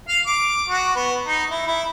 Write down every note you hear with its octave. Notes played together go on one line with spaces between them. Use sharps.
F5
D6
F#4
B3
D#4
E4
E4